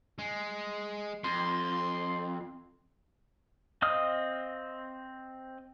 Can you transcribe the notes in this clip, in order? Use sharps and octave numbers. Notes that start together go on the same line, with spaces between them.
G#3
F2 C6
C4 D#5 F5 D#6 F6